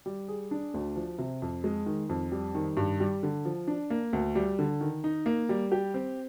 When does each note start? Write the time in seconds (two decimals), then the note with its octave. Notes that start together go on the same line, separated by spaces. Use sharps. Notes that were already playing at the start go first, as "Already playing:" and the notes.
0.06 G3
0.28 G#4
0.51 D4
0.74 D2
0.96 F3
1.18 C3
1.42 F2
1.64 G#3
1.86 D#3
2.09 F2
2.32 G3
2.55 D#3
2.77 G2
3.00 G3
3.23 D3
3.45 F3
3.67 D4
3.90 A#3
4.13 D2
4.35 G3
4.59 D3
4.81 D#3
5.04 D#4
5.26 A#3
5.49 G3
5.72 G4
5.94 C4